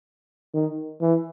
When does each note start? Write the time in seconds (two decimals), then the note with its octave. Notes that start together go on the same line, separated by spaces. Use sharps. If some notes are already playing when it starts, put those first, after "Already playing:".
0.53 D#3
1.01 E3